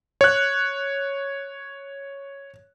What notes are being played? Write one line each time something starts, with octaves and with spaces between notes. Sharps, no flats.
C#5 F#6